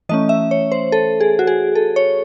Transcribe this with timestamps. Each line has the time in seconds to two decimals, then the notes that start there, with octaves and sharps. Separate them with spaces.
0.09 E3 A3 C#4 D#5
0.29 E5
0.51 C#5
0.72 C5
0.92 A4
1.20 G#4
1.39 F#4
1.47 G#4
1.75 A4
1.96 C#5